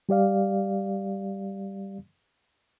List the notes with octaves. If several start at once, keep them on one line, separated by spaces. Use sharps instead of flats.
G3 G4 D5 F5